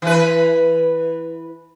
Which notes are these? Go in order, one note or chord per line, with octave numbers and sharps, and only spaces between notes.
E3 B4